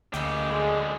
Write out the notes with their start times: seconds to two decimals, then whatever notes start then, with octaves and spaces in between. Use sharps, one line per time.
0.14 D2 C#3 F#3 A#3 D#4 G4
0.50 D3 G#3 G#4